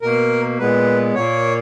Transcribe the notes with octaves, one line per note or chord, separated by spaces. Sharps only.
B2 A#3 A#4
A#2 G#3 B3 B4
A#2 A#3 C#5